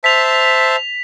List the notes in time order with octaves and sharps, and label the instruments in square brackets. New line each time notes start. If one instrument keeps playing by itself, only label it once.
[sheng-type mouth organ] C5 E5 A5 [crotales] B6 F7